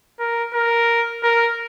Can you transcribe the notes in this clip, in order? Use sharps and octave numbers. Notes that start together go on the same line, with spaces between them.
A#4
A#4
A#4